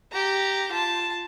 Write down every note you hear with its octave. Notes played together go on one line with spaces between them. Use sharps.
G4 A#5
F4 A5